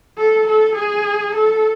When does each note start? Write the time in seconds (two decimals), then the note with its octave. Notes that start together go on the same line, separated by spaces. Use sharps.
0.18 A4
0.48 A4
0.76 G#4
1.35 A4